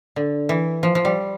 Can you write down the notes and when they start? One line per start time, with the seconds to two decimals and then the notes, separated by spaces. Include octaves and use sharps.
0.16 D3
0.49 E3
0.83 F3
0.95 F3
1.05 G3